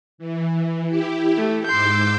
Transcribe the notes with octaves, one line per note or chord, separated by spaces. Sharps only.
E3
E4 G4
A3
G#2 C6 D6 E6 G6